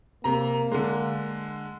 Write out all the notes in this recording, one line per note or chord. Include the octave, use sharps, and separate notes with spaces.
C3 A#3 A#5
D3 G#3